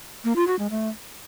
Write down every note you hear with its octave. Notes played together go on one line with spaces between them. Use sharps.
A#3
F4
F#4
G#3
A3